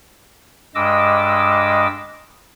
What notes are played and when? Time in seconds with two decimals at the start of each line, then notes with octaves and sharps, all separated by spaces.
0.75 G2 G#3 D#5 D6 E6